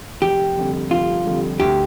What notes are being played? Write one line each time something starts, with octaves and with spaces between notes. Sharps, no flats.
F1 G4
F2 D3 G3
F1 F4
F2 D3 G3
D2 G4